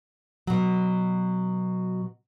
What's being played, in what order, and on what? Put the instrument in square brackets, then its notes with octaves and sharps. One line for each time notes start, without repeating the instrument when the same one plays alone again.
[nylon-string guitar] B2 F#3